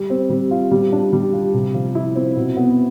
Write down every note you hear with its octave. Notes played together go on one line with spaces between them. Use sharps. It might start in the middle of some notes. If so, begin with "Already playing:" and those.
Already playing: G3
C4
G3
F4
G3
D4
G3
F4
C3
F3
E4
C4
B2
B3